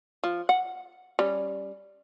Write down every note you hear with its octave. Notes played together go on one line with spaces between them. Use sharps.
F3
F#5
G3 C#4